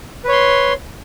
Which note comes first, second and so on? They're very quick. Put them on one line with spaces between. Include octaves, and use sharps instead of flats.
B4 C#5 C6